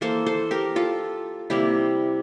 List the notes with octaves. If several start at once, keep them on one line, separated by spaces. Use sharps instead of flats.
E3 A#3 A4 C5
A4 C5
G4 A#4
F4 A4
C3 G3 A#3 E4 G4